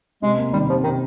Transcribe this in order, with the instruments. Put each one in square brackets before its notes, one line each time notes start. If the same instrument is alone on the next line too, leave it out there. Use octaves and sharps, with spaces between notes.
[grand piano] C3 [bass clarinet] G#3
[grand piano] A#3
[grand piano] D#3 [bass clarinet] G3
[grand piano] C3 [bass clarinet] F3
[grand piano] C3 [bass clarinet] D#3